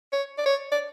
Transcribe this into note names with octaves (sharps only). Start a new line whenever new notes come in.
C#5
D5
C#5
D5